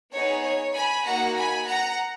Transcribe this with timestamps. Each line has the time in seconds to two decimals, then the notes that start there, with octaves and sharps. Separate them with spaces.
0.13 B3 D#4 G#4 C#5
0.44 C#5
0.74 G#5 B5
1.05 A#3 D#4 F#4 F#5 A#5
1.36 G#5 B5
1.67 F#5 A#5